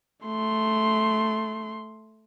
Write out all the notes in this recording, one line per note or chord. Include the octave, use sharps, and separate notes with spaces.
A3 C6